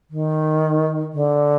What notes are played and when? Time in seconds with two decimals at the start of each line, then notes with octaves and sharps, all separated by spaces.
0.10 D#3
1.13 D3